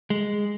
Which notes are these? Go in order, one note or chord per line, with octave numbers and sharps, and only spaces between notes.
G#3